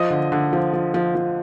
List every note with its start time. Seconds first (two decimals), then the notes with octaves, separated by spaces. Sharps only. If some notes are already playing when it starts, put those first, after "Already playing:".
Already playing: F3 D#5 D#6
0.10 D3
0.32 D3
0.53 F3
0.73 F3
0.94 F3
1.15 F3